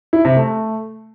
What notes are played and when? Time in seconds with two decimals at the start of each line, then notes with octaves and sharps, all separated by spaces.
0.13 E4
0.25 C3
0.36 A3